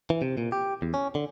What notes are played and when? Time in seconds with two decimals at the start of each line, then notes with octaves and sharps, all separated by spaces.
0.10 E3
0.22 C3
0.38 A#2
0.52 G4
0.82 E2
0.94 C#4
1.15 D3